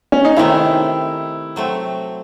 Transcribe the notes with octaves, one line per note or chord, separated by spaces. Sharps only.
C#4
D#4
C3 D#3 A3 C4 E4
F#3 A3 C4